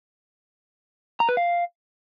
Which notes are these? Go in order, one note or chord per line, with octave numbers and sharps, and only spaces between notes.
A#5
B4
F5